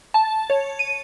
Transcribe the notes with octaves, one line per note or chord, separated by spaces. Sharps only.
A5
C#5
D#7